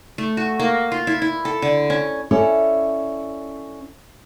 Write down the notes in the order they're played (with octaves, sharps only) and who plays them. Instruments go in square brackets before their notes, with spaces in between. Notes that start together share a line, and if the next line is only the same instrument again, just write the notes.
[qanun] A3
F#4
A#3
F4
E4
E4
A4
D3
C#4
[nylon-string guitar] C#4 E4 A4 C#5 D5